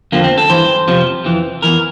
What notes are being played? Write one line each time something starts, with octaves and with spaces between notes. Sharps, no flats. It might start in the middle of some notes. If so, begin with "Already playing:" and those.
F2 D3 F3 A#3
C4
A4
G2 E3 C5
F2 C3 F3
F2 E3
E2 E3 A#4